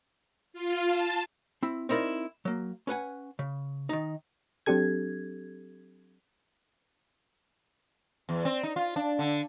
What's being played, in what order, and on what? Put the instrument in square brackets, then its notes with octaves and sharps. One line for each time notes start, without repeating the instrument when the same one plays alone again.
[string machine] F4
A5
[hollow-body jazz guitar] C4 E4
C4 D#4 E4 A#4 D5
F#3 A#3
C#4 B4 F#5 G#5
C#3
D#3 D#4
[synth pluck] F#3 C4 D4 G4 A4 G#6
[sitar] E2
C4
D#4
F4
D4
D3